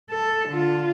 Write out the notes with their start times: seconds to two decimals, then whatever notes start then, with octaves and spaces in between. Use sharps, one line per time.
0.11 A4
0.49 D3 F4